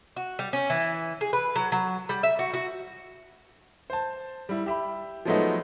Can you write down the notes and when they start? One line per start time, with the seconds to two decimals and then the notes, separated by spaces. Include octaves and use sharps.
0.16 F#4
0.39 G3
0.53 C#4
0.70 E3
1.21 G#4
1.33 B4
1.56 F#3
1.72 F#3
2.09 G3
2.23 E5
2.39 F#4
2.54 F#4
3.90 C5 A5
4.49 G3 E4
4.66 G4 E5 B5
5.25 F3 F#3 G#3 A3 B3 D#4